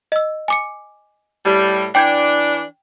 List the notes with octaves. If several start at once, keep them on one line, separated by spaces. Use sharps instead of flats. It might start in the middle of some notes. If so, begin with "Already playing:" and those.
D#5 E6
G#5 D6 C#7
A2 G3
E3 D4 G5 G6 G#6